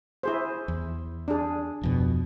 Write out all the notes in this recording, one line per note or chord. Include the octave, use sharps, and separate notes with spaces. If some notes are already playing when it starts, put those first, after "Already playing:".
E4 G#4 C5
E2
D4 G#4
D1 F2 B2